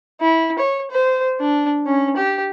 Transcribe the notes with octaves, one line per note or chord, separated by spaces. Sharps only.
E4
C#5
C5
D4
C#4
G4